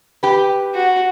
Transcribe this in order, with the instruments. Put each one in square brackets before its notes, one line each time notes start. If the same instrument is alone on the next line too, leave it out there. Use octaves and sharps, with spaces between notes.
[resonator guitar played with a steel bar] G4 B4
[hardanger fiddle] F#4